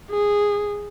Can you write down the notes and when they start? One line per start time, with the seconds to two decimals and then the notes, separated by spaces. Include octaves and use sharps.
0.11 G#4